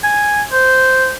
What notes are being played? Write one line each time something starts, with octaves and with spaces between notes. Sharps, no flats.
G#5
C5